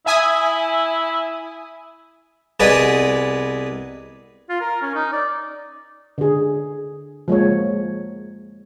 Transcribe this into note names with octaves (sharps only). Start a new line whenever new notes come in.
E4 E5 G#5 D#6
C2 B3 G#4 B4 D5 D#5
F4
A#4
C#4
D#4
D5
D3 G#4
F3 G#3 A#3 C#5